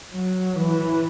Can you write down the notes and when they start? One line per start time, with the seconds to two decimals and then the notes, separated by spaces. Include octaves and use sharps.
0.13 F#3
0.56 E3